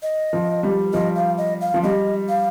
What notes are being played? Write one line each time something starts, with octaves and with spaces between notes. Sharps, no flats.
D#5
F3
G3
F3 D#5
F5
D#5
F5
F3
G3 D#5
F5